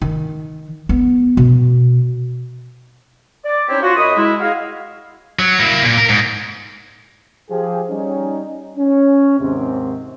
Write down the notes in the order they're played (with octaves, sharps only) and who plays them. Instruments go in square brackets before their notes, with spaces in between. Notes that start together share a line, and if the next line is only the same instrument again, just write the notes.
[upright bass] D#3
B3
B2
[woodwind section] D5
C4 C#4 D#4 E4 G4 C#5
F4 F#4
F#2 F#4 D#5 B5 D#6
G#3 E4
F#4 G#4 D#5 F5
[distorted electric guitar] F#3
A#3 E4
A#2
A#4
G#2
[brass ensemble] F3 G4 G#4
G3 C#4 D#4
C#4
D#2 G#2 C3 C4